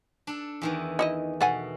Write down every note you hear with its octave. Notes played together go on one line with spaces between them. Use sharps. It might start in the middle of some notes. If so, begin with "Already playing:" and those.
D4 A4
E2 D#3 E3
D#4 E4 D#5
B2 A4 F#5 G#5